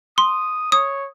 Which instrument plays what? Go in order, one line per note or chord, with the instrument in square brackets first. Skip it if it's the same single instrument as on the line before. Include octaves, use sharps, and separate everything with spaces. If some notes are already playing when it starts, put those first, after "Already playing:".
[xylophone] C6 [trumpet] D#6
[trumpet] C#5 [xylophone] D#6